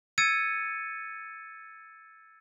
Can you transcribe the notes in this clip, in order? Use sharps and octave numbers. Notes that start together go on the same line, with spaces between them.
E6 G#6 A6 C#7 D#7